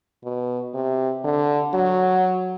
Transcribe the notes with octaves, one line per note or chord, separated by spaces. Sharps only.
B2
C3
D3
F#3